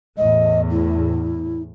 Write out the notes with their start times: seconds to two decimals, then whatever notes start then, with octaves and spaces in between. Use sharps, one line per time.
0.18 E2 A2 D#5
0.71 E4